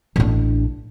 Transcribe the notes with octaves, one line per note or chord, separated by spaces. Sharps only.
A1 D4